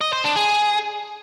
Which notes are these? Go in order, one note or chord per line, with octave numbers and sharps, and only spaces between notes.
D#5
C5
D4
G#4